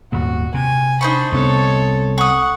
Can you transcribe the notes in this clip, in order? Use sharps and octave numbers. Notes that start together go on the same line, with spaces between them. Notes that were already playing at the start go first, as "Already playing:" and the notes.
D#1 D#2 G#2 F#4
C3 G#5
D4 D#4 C5 B5 C#6
C2 C3 B3 A4 C#5
F#5 C#6 D#6